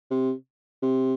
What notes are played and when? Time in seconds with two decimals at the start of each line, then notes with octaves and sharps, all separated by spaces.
0.11 C3
0.82 C3